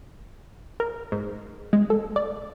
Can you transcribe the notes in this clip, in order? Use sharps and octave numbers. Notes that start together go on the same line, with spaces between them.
A#4
G#2
G#3
A4
D5